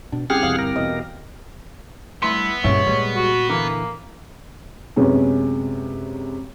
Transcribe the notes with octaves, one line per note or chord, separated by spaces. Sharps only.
B2 D4
C2 C#4 G4 G#4 F#5 F6
E2 B2 F5
G1 A#4
E2 B2 D#5
G2 A3 B3 E4 C6
G2 A#2 G#3 C#4 E4 C#5
A#2 G3 G#3
F#4
D3 E3 A#3
F#2 C3 G#3 B3 C#4